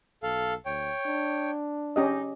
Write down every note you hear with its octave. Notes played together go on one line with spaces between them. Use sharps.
B1 A4 F5
D2 C#5 G5
D4
C#4 D#4 G4 D#5